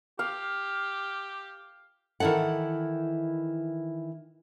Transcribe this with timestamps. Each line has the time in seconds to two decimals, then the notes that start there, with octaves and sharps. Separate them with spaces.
0.19 G4 F5
2.20 D#3 E3 E4 A4 F#5